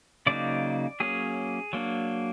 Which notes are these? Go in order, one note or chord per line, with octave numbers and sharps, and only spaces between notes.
C#3 F#3 A#3 D#4 D5
F#3 A#3 C#4 G#4
F#3 A#3 D4